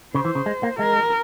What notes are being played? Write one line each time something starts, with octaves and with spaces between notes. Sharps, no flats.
C#3 C5
E3
C#3
G#3
A#3
G#3 A#4